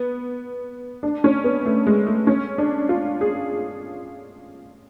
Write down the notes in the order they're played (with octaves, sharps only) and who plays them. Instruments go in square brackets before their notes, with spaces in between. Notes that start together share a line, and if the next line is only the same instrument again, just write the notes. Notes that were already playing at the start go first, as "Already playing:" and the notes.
Already playing: [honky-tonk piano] B3
D4
C#4
B3
A3
G#3
A3
C#4
D4
F4
G#4